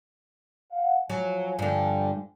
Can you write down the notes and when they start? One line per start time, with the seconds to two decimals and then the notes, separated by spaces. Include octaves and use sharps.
0.71 F5 F#5
1.10 F3 F#3 G#5
1.59 G2 D3